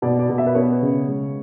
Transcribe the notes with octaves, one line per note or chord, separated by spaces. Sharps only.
B2 D5
D5
B2
E5
B4
B3 C#5
C#3
G#3